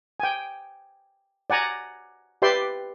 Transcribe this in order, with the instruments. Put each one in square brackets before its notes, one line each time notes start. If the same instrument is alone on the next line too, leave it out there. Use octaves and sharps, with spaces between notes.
[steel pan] G5 G#5
D5 F#5 G#5 A#5
G4 B4 D5 E5 G5 C6